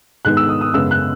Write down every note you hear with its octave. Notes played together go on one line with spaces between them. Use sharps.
G#2 D#3 G#3 B3 F#6
E6
D#6
D#6
F#2 C#3 G#3 B3 E6
F#6